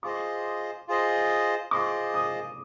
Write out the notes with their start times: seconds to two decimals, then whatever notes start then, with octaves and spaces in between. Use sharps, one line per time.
0.03 F4 G#4 C5 D#5 D6
0.88 F4 G#4 C5 D#5
1.71 F4 G#4 C5 D#5 D6
2.14 D#6